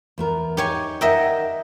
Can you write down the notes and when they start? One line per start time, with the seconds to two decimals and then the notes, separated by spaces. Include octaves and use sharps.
0.18 E2 B3 A#4
0.57 D#4 G4 C#5 G#5
1.01 A#4 D#5 E5 F#5 G5